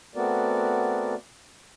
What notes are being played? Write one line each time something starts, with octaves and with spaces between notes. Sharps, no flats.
A3 B3 C4 F#4 A#4 D5